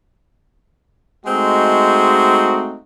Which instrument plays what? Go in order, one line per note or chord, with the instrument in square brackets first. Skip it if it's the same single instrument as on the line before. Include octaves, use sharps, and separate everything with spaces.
[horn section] G#3 A3 C4 D#4 F#4